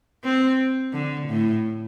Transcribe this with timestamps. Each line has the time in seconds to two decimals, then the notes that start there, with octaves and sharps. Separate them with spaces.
0.24 C4
0.93 D3
1.28 A2